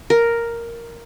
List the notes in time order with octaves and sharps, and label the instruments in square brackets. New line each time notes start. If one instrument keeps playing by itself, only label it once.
[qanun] A#4